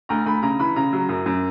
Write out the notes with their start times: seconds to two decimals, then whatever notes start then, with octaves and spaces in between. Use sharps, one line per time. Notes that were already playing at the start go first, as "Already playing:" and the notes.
0.09 D2 A#5
0.26 D2 B5
0.42 C#3 A#5
0.59 E3 B5
0.76 C#3 A#5
0.93 F#3
1.09 F#2
1.26 F#2